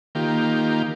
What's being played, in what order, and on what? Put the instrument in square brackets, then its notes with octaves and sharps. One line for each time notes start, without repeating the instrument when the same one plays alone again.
[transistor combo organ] D#3 A#3 F4 G4